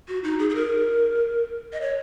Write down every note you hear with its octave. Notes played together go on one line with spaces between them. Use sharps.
F#4
D#4
G#4
G#4
A#4
D#5
C#5